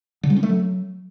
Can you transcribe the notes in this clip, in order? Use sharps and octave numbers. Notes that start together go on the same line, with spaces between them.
D3
G3
C#4
A3
F#3